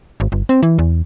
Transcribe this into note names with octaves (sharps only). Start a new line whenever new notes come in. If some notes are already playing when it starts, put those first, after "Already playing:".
G#1
G1
C4
E3
E2